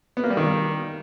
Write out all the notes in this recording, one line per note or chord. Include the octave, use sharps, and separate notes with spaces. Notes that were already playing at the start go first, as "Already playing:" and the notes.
B3
A#3
G3
D#3